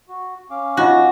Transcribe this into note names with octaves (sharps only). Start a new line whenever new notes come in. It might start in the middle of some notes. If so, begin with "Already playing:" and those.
F#4
C#4 F5 D6
D#4 F4 F#4 D#5